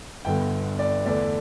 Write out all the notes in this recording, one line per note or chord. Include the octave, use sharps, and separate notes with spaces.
G1 G2 D3 B3 G5
D5
E2 D3 A3 D5